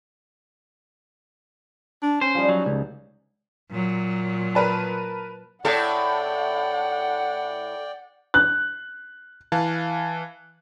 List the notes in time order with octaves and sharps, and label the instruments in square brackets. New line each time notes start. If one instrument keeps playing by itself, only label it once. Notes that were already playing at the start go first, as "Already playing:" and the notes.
[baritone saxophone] D4
[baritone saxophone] C#4 [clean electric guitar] C5
[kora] F3 G3 D#4
[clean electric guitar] F#3
C#2
[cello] A#2 F#3
[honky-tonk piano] A#4 B4 A5
[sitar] A2 A4 [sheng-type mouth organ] D5 G5 [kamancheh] F#5
[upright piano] F#6
[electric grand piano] E3 F5 A5 F#6